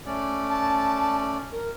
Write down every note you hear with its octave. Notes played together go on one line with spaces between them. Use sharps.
A3 C#4 D5
A5
A#4